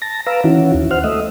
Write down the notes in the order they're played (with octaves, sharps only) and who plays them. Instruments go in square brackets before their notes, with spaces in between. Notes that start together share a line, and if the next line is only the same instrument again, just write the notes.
[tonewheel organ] A5 A#6
B4 F5 A#5 D6 E6
D#3 E3 C#4 E4 F#4
D#2
C5 F#5 F6
A3 D#5 E5